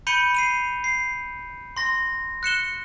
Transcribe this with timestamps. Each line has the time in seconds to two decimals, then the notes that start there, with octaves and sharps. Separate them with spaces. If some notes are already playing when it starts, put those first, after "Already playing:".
0.07 B5 G6 C#7 D#7 F7 G7
0.35 C7 D#7 F7
0.84 C7
1.77 C6 A#6
2.43 F#6 C#7 E7 G7